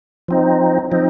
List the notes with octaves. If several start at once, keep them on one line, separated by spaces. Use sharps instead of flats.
F3 C4 D#4
F3 C4 D#4